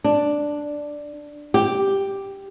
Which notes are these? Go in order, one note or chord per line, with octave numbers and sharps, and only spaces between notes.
D4
G4